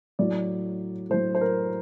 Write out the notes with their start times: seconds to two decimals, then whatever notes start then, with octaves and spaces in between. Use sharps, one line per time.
0.19 A2 F#3 D5
1.10 A2 F#3 C5
1.35 C5
1.41 A#4